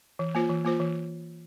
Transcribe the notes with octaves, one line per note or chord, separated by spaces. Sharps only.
E3
A#3 F4 C5
E3
A#3 F4 C5
E3